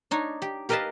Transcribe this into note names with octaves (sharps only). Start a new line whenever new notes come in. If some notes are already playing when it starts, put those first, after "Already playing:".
D4 D#4 C#5
G4
G4 A#4 B4 D#5 F5 A5